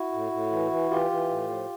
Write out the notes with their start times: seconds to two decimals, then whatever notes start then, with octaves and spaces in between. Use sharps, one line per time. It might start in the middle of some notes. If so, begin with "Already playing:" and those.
Already playing: E4 F#4
0.12 A2
0.32 A2
0.51 E3
0.71 E3
0.90 E3 F4 G4
1.11 E3
1.30 A2
1.50 F3